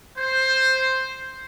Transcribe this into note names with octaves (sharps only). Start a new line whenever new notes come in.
C5